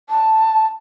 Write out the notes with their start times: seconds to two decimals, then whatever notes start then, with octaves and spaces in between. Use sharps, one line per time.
0.10 A5